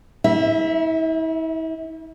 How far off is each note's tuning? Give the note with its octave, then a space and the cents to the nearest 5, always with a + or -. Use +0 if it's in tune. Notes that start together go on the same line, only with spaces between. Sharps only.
E4 -40 E5 +0